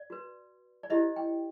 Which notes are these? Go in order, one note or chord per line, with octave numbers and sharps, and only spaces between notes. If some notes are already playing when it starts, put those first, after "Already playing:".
Already playing: D5
F#4 B4
D5
E4 G4 C5 D#5
G5